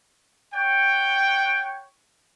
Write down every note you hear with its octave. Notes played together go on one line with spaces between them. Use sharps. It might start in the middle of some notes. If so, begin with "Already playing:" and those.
C#5 F#5 G5